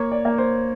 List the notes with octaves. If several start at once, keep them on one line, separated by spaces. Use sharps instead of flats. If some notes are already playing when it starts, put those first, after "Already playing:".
Already playing: A#3 C#5
D5
A#3
C5